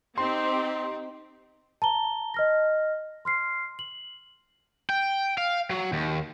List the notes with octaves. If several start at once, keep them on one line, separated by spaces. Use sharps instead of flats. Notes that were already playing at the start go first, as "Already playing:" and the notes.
C4 D#4 G4 C6
A5 A#5 G7
D#5 F6 A#6
C6 F6 C7
F#7
G5
F5
F#3
D#2